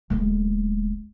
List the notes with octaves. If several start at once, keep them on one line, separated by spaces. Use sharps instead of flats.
D1 G#3